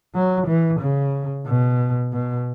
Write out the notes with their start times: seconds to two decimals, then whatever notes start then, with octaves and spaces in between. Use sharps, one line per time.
0.15 F#3
0.47 E3
0.80 C#3
1.46 B2
2.12 B2